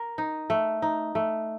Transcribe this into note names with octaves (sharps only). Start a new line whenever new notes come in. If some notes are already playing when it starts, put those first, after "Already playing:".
Already playing: A#4
D#4
A3
D#4
A3